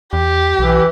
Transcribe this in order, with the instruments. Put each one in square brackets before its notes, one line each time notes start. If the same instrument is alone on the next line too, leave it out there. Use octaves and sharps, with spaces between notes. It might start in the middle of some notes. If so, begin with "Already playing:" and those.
[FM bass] E2 [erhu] G4
[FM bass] B1 [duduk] E3